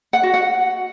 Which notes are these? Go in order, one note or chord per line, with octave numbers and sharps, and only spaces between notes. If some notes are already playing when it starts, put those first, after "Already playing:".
F#5
F#4
F#5